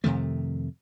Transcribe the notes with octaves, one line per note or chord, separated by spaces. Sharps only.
F2 C3 D#3 A3